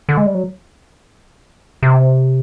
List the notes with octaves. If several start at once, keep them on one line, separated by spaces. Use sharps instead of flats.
D3
G#3
G3
F#3
C3